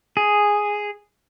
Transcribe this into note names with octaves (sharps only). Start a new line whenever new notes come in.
G#4